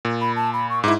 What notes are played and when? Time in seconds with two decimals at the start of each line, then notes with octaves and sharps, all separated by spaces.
0.05 A#2
0.21 B5
0.36 A5
0.53 B5
0.70 C#6
0.84 G#2 E4 D6